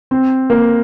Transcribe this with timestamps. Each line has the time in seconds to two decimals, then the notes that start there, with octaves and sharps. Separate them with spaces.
0.11 C4
0.50 A#3